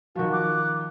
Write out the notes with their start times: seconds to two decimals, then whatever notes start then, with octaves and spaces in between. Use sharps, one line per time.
0.16 D#3 F3 F#4
0.32 D6 F#6